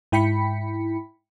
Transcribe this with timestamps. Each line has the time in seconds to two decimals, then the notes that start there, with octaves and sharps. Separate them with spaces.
0.12 G#2 E4 G5 B5 B6 C#7